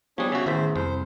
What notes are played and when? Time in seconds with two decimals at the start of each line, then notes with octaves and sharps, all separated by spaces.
0.18 F3 G3 B3 D4 G#4 C#5
0.32 C#3 F#4 E5 E6
0.46 A1 E2 D#3 C5 E5
0.76 C2 F2 C5